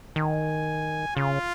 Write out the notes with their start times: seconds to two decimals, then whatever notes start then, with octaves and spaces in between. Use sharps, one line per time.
0.16 D#3 G#5
1.16 C#3 F4